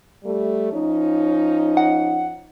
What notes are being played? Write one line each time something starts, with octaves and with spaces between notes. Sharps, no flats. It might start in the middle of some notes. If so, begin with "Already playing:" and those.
G3 A3
F3 C#4 D#4
F#5